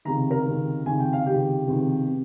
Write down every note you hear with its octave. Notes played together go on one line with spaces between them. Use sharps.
C#2 C3 D#3 A#5
A#4 A#5
C#2 C3 D#3
C#2 C3 D#3 G#5
G5
F5
C#2 C3 D#3 G4 G5
C#2 C3 D#3
C3